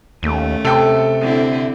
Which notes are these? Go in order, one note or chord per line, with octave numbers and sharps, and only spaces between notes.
D#2 A3 C#4
C3 A4 G5
D3 C4 E4